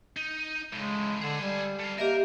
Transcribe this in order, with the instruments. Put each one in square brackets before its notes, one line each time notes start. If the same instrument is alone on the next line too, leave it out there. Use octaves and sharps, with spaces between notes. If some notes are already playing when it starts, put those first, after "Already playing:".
[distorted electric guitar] D#4
[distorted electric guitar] A2 C#3 [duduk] G#3
[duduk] D3 [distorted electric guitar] G#4 A4
[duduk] G3
[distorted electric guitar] A3 F5
[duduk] A#3 [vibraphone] G4 D#5 E5 [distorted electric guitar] A#4